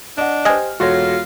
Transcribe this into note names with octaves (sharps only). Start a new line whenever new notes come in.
D4 D#5 F#5
G4 C5 D#5 G#5 F6
E1 F4 F#4 A4 C#5 C6 A#6